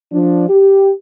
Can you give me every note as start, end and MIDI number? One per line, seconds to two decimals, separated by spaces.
0.12 0.47 53
0.12 0.47 62
0.49 0.91 67